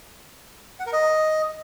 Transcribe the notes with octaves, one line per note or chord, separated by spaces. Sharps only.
F#5
A#4
D#5